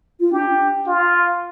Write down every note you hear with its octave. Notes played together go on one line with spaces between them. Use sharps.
F4
D4 G4
D4
F4